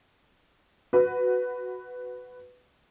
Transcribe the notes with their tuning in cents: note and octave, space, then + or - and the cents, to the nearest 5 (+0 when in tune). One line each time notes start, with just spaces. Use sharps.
F#4 +0 B4 +10